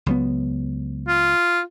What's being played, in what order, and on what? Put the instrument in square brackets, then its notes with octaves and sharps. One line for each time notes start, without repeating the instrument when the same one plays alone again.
[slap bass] C#2 F#3 B3
[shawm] F4